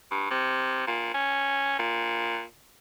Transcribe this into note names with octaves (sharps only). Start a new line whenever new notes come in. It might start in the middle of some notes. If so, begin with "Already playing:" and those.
G2
C3
A#2
C#4
A#2